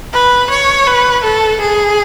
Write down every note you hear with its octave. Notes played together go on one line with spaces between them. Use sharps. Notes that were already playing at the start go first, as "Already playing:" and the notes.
B4
C#5
B4
A4
G#4